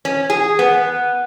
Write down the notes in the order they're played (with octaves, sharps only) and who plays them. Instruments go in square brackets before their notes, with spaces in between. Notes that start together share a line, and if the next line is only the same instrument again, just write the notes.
[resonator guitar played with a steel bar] C#4
G#4
B3